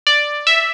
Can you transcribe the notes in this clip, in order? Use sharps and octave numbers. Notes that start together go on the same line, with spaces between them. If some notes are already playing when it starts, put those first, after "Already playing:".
D5
E5